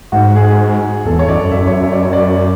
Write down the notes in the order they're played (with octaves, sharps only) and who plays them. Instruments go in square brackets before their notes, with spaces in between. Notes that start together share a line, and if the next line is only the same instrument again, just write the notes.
[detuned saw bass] G#2 [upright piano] F#4
[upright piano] G#4
[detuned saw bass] E2 [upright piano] A4
[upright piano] C#5
[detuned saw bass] F#2 [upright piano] D5
[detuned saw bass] F#2 [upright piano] E5
[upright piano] C#5
E5
D5
C#5
D5